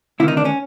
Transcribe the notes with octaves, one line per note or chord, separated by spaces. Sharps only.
D2 C3 D#3 E4
D#4
D4
C#4